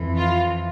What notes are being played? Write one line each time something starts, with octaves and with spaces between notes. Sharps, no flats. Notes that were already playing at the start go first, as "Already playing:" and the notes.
Already playing: F2 E3
F4